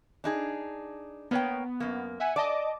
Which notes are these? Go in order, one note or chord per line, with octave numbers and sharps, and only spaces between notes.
D4 D#4 G#4
A#3 B3 C#5 G5
F#2 A#3
E5 F#5 G#5
D5 D#5 A5 D6